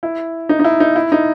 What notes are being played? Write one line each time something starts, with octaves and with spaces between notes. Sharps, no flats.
E4
D#4
D#4
E4
D#4
E4
D#4